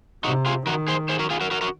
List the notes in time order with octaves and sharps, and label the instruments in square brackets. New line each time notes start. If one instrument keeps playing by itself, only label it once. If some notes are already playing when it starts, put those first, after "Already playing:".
[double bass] C3 [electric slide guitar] D#4 F#4
[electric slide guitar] F4 G#4
[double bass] D#3 [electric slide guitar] F#4 A#4
[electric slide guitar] G#4 C5
G#4 C5
F#4 A#4
F4 G#4
F#4 A#4
F#4 A#4
F#4 A#4